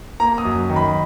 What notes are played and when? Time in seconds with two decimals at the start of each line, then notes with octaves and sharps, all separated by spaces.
0.20 A#3 A#5
0.38 D#6
0.45 F#2
0.70 D#3
0.76 B5